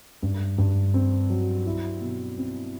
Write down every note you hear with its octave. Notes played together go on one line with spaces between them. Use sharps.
G2
G2
C4
F#3
E4
B2
C4